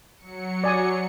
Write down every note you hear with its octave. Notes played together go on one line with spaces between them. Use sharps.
F#3 C#7
D5 G#5 D#6